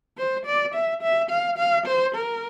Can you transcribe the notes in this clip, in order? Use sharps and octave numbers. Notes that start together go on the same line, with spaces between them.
C5
D5
E5
E5
F5
F5
C5
A#4